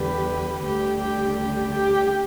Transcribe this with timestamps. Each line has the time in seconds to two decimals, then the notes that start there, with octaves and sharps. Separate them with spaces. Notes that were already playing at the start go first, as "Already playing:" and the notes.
Already playing: E2 D3 G3 G4 B4
0.63 D2 D3 G3 G4
0.99 G4
1.36 G4
1.72 G4